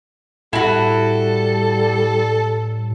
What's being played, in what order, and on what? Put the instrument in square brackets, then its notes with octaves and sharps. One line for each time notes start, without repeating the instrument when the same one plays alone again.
[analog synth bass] A2 [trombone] G3 [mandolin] E4 F#4 [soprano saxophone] A4